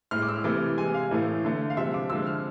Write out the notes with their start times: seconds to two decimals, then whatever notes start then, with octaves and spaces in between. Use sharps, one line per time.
0.11 A2 G#3 F6
0.22 D6
0.28 E6
0.44 C3 E3 A3 D6
0.77 C3 G#3 G#5
0.94 F5
1.11 A2 E3 A3
1.44 D3 A3
1.70 F5
1.77 C3 F3 G#3 E5
1.94 D6
2.10 D3 F3 G#3 E6
2.26 F6